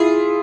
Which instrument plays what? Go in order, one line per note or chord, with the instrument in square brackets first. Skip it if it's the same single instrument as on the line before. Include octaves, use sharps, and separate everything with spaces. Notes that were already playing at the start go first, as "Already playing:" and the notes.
Already playing: [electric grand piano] E4 F4 [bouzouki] G#4